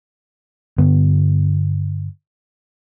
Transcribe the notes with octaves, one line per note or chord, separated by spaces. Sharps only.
G2 D3 B3